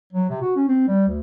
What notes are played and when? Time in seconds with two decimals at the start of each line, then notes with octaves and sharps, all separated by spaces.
0.13 F#3
0.29 C3
0.41 F#4
0.56 C#4
0.68 C4
0.87 G3
1.08 D2